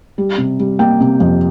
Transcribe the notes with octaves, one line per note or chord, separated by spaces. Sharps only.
G3
C3
G3
A#3 G5
C3
F2